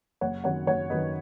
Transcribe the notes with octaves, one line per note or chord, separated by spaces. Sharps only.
F#1 C#5 F#5
F#2 D#3 F#3 C#5 F#5
F#1 C#5 F#5
F#2 D#3 F#3 B4 D#5